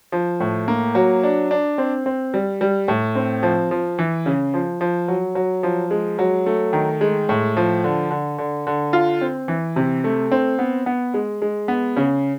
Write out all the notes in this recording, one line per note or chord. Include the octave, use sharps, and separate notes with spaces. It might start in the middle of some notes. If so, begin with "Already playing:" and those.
F3
A2
A#3
F#3
D4
D4
C4
C4
G3
G3
A2
C4
F3
F3
E3
C#3
F3
F3
F#3
F#3
F3
G#3
F#3
A3
D#3
G#3
A2
F3
D3
D3
D3
D3
F4
C4
E3
C3
A3
C4
B3
B3
G#3
G#3
B3
C#3